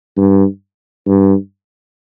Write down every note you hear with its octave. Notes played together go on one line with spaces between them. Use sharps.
G2
G2